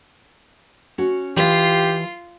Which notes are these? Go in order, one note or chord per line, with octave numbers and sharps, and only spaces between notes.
C#4 F#4
E3 F4 G4 B4 D#5 C7